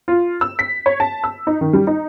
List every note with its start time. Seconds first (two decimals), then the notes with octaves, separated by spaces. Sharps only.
0.08 F4
0.41 E6
0.59 B6
0.86 C#5
1.00 A5
1.24 E6
1.47 D#4
1.61 D#3
1.73 G3
1.87 D#4